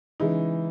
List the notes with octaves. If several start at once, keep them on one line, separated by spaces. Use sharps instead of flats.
C#3 E3 G#3 D#4